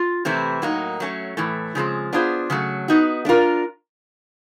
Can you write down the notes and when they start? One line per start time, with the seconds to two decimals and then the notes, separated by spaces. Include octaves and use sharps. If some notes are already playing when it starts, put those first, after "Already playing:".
Already playing: F4
0.25 C3 E3 A3 C4 E4
0.62 A2 F#3 A#3 D#4
1.00 F#3 A3 C#4
1.37 A2 E3 A3
1.75 C#3 F3 G#3 C4
2.13 B3 D4 F4 G#4 C5
2.50 C#3 F#3 A3
2.88 B3 D#4 F#4
3.25 A3 D4 F4 A#4